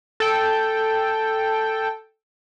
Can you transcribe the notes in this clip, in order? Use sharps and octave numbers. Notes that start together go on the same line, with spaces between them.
A4 G5